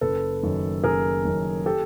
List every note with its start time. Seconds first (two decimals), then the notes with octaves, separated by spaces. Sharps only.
0.01 F#1 A4 B4
0.43 F#2 D#3
0.84 F#1 G#4 A#4
1.25 F#2 D#3
1.66 G4 A4